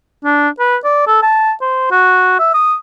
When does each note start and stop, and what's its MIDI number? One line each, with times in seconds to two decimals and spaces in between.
0.25 0.49 62
0.60 0.77 71
0.84 1.05 74
1.07 1.20 69
1.23 1.52 81
1.62 1.89 72
1.91 2.37 66
2.39 2.54 76
2.54 2.76 87